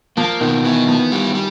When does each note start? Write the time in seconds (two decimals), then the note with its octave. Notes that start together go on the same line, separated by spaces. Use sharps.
0.17 F3 A#3
0.40 B2 D#3
0.63 E3 B3
0.87 F3 B3
1.12 G3
1.35 G3